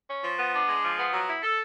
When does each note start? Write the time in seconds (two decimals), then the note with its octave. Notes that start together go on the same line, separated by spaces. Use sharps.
0.09 C#4
0.23 F3
0.39 B3
0.54 D4
0.68 G#3
0.83 F3
0.98 B3
1.13 F#3
1.28 E4
1.43 A4